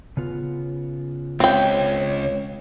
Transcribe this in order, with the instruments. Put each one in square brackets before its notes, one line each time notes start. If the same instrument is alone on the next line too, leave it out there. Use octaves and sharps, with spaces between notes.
[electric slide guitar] C#3 B3 F4
[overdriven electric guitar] C#2 [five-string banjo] C4 G5 [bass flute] C#5